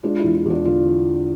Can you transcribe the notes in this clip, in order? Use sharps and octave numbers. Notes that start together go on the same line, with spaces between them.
G#3 D4 F4
E2 E4
E4
E2 D4 F4
D3 D4 F4